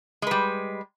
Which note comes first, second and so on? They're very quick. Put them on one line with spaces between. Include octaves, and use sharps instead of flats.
G#3 B4 G3